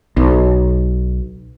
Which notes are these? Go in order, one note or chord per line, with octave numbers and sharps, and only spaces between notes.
B1